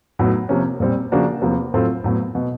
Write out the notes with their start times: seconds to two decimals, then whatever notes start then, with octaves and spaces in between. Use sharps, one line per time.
0.19 A2 F#3 B3 D#4 F#4
0.49 C3 F3 A#3 C#4
0.80 A#2 G3 C4
1.12 C#3 F3 A#3 D4 F#4
1.42 E2 C3 F3 A#3
1.74 A2 F#3 A3 C4 F4
2.04 A2 F#3 B3
2.35 B2